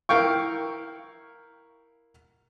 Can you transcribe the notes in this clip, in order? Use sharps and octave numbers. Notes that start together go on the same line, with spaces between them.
E4 A#4 F5 G5 C#6